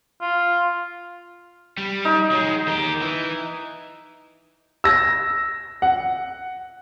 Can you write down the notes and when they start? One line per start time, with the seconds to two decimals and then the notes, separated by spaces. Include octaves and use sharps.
0.21 F4
1.78 G3
2.05 D#4
2.32 F#3 G#3
2.68 D#3 G4
3.02 E3
4.84 E6 A#6
5.82 F#5